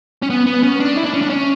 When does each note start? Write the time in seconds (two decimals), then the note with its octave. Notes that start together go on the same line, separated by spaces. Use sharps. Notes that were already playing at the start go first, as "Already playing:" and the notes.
0.22 C#4
0.30 B3
0.46 B3
0.63 C#4
0.80 D4
0.96 E4
1.05 D4
1.14 C#4
1.22 D4
1.30 C#4